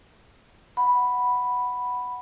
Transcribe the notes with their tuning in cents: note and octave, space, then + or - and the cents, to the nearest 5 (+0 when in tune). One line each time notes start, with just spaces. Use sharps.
F#5 +0 B5 +0